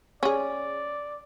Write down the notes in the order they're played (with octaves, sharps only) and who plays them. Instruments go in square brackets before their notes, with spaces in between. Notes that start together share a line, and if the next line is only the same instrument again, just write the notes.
[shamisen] C#4 G#4 [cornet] D5